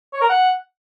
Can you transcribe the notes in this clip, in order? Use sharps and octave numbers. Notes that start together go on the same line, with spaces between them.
C#5
A#4
F#5